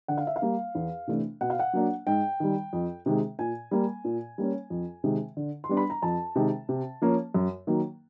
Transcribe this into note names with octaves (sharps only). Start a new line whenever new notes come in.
D3 F#5
F5
E5
F5
G3 A#3
E2
C3 E3 A3 D4
B2 F#5
F5
F#5
F#3 A#3 D4
G#2 G5
D#3 G3
F2
C3 D#3 G#3
A#2 G#5
G3 A#3
A#2
G3 A#3 C#4
F2
C3 D#3 G#3
D3
C6
G3 B3 D4
B5
A#5
F2 A5
C3 D#3 G#3
C3
F3 A#3 C#4
F#2
D#3 F#3 A#3